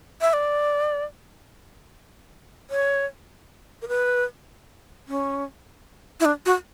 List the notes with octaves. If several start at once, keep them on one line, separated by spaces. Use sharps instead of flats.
E5
D5
C#5
A#4
B4
C#4
E4
D4
F#4